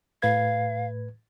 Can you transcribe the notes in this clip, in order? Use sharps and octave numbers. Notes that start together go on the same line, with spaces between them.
A2 B4 F5 G#6